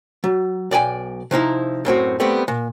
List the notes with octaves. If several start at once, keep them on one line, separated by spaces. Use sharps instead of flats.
F#3
B1 D5 G5 G#5
C3 F3 D#4 E4
F#2 A2 C4 F#4
G3 A3 B3 C4
A#2